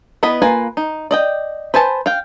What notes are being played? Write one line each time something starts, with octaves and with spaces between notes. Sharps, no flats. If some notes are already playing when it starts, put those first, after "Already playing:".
B3 E4 D#5 B5
A#3 F4 B4 G#5
D#4
D5 D#5 G5
B4 C5 G#5 A5
F5 G5